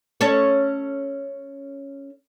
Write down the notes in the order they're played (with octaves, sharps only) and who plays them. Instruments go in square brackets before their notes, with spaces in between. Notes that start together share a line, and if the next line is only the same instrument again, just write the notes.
[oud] C#4 A4 C#5